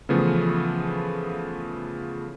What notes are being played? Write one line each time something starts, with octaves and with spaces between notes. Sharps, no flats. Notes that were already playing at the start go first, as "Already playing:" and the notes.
C#3 E3 F3 A3 B3